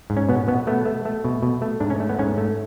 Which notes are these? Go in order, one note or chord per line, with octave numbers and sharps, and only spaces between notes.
G#2
C#4
B2 B3
B2 B3
A3 B3
A3
A3
B2
B2
A3
G#2 D4
C#4
A3
B3
G#2 C#4
A3